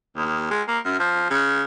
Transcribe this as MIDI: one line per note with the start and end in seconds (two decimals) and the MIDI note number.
0.17 0.47 39
0.51 0.62 56
0.68 0.78 58
0.85 0.97 42
0.99 1.29 53
1.30 1.63 49